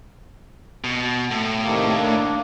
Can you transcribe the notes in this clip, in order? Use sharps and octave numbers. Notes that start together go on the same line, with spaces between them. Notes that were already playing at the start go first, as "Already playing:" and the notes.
B2
A2
C3 D#3 A#3
A#3 D4